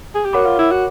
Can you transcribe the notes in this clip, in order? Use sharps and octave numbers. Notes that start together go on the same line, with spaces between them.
G#4
G4
F#4 A#4 C#5 F#5 B5 D6
F4
E4
F#4